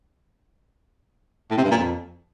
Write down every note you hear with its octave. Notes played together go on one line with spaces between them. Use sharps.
A2
C3
G2
A#2
F2